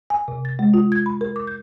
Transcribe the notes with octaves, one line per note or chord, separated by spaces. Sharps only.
G#5
C3
A6
G#3
F4
G#6
B5
A#4
D6
G6